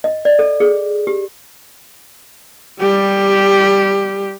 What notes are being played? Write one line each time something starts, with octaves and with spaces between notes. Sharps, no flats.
D#5
D5
A4
G#4
G4
G3 G4